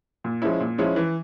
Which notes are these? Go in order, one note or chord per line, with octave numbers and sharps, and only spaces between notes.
A#2
F3 G#3 C#4 E4
A#2
F3 G#3 C#4 E4
E3